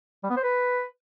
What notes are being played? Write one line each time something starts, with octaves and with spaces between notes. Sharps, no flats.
G3
B3
C5
B4